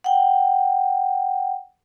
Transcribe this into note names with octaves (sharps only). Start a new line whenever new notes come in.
F#5 G5